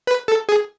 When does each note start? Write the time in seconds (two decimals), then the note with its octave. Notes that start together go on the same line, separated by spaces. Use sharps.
0.07 B4
0.28 A4
0.49 G#4